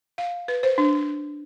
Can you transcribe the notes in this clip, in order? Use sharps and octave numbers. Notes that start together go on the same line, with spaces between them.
F5
B4
C5
D4